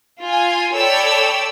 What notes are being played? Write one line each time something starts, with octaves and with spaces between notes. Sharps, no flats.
F4 G#5
A4 C#5 D5 G5 B5 E6